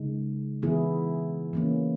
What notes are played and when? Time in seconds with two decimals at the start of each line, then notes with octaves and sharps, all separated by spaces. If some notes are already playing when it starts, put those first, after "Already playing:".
Already playing: C#3 G#3 D#4
0.63 E3 B3 E4 G#4
1.53 E3 A#3 C#4